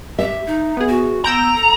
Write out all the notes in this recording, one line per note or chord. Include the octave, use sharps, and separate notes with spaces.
G4 E5
D#4
B3 G#4
F#4
B3 A#5 E6 G6 D7
A4